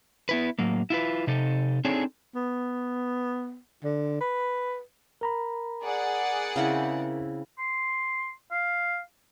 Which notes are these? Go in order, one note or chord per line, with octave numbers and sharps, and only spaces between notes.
B3 E4 B4
A2 F#3 A#3
E4 F4 B4
C3 D#4 A4
C4 D4 D#4 G#4 A4 C#5
B3
D3
B4
A#4 A#5 B5
G#4 D5 F#5
C#3 C4 E4
C6
F5